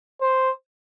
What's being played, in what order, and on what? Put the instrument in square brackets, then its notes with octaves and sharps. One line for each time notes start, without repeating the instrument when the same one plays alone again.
[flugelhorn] C5